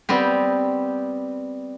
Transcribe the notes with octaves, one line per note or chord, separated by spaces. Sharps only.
G3 B3 C4 G4